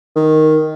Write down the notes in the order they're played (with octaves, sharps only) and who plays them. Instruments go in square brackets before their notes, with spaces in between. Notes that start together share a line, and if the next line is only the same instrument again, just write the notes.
[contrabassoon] D#3